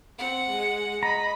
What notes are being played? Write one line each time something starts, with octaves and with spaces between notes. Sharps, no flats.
C4 F#5
G#3
D#5 A#5 B5